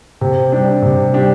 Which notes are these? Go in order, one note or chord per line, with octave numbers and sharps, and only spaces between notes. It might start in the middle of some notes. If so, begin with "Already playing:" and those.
C3
G3 D4 G4
C3
G3 D4 G4